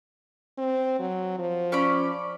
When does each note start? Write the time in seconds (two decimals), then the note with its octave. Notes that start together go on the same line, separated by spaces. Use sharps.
0.58 C4
0.99 F#3
1.39 F3
1.72 C#4 D5 B5